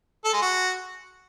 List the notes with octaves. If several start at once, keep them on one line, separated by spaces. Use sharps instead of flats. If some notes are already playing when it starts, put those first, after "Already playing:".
A4
G#3
F#4